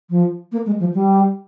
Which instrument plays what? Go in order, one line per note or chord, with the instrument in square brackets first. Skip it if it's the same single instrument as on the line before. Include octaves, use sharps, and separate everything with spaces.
[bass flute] F3
A#3
G#3
F3
G3